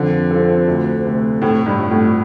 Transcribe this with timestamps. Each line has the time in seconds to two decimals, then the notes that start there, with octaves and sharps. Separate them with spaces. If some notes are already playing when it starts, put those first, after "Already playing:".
Already playing: F2 D3
0.31 F3 C4 A4
0.68 D2
1.05 C3 A3 C4
1.42 A2 C3
1.66 G2
1.79 G3 F4
1.91 A2